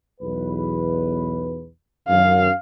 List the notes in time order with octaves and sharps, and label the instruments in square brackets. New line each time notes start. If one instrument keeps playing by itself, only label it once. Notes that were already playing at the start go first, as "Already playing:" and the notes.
[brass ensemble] B1 E2 B4
[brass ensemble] F#2 [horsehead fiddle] F5